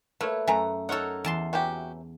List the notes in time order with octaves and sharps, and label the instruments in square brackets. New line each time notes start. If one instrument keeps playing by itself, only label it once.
[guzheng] A3 [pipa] A#3 [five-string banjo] B4 C#5
[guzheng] F#2 A3 [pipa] E5 G#5 A#5
[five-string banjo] D#4 A#4 C#5 [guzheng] A4 F#5
[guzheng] E2 A5 C6
[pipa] C3 E3 F#3 [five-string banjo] F#4 G4